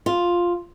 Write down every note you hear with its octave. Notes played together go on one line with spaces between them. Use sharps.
F4